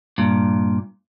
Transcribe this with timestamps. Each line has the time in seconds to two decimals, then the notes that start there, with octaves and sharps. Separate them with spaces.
0.18 G2 A#2